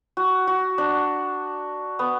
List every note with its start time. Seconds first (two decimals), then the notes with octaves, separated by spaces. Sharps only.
0.17 F#4
0.47 F#4
0.78 D4
1.99 B3